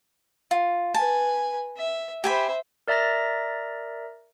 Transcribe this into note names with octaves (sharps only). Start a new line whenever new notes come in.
F4
B4 G#5 A5
E5
G4 C5 E5 G#5 B5
A#4 D5 E5 A#5 A6 A#6